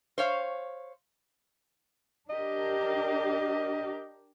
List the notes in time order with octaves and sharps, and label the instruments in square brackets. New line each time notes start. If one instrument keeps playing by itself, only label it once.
[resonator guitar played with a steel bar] C5 C#5 F5
[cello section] D4 G4 A#4 [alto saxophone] D#5